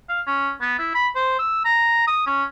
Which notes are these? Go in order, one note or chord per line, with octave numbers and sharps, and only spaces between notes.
F5
C#4
B3
E4
B5
C5
E6
A#5
D#6
C#4